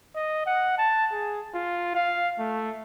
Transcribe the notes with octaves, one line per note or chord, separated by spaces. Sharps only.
D#5
F#5
A5
G#4
F4
F5
A3